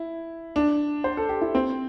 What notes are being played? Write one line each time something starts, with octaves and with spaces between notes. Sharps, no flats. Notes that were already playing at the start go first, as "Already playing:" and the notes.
Already playing: E4
D4
C5
A4
G4
E4
C4